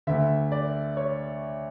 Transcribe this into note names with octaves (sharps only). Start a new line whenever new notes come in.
D2 D3 E5
D5
C#5